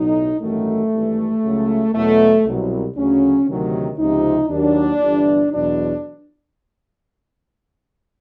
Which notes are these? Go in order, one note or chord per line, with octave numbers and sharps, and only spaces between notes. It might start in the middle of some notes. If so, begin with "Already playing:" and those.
Already playing: B1 A2 F#3 D#4
A1 G2 D#3 F#3 A3
G#1 G2 E3
C#2 C#3 F#3
E2 B2 F#3 A3
C2 B2 F#3
D2 C#3 F#3 C#4
D2 C3 D#3 F#3
C#2 C3 F3 D#4
D#2 D#3 F#3 D4
G1 G2 E3
E2 B2 F#3 D4